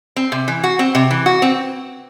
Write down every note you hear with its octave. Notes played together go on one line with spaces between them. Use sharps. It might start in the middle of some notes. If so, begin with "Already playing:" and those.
C4
C3
E3
F#4
C4
C3
E3
F#4
C4